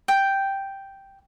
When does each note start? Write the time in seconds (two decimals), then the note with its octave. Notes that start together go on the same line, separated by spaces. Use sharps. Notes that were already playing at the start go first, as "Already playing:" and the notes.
0.08 G5